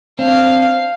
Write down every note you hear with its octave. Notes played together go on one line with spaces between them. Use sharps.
C4 D4 F5